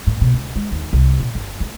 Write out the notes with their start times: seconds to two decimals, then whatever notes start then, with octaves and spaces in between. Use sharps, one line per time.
0.07 A2
0.21 B2
0.34 C#2
0.56 G#3
0.72 D#2
0.93 C2
1.20 A#2
1.35 G1
1.60 A3